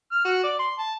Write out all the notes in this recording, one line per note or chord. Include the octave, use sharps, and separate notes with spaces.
F6
F#4
D5
C6
A5